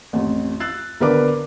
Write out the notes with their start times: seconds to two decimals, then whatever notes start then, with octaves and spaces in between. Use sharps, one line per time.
0.13 A1 F2
0.60 E6 F#6 A6 C7
1.00 B1 D3 A#4 B4 D5 D6